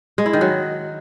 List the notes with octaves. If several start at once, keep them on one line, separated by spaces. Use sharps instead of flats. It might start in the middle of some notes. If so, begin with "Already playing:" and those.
G#3
E4
D#3
F#3